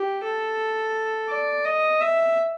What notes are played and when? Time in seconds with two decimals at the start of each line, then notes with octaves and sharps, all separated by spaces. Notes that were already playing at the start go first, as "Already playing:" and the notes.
Already playing: G4
0.24 A4
1.30 D5
1.65 D#5
2.01 E5